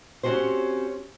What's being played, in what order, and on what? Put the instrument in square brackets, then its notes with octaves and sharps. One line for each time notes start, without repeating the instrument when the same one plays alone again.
[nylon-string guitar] C4 C#4 D#4 F#4 G4 C5